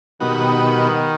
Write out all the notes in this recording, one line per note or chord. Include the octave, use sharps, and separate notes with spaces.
B2 D#3 G3 B3 D#4 F#4
D#3